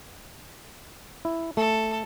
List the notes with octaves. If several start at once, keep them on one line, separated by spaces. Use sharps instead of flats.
E4
A3 A4